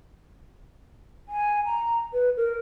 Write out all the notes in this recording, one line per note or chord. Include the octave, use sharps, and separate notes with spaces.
G#5
A#5
B4
A#4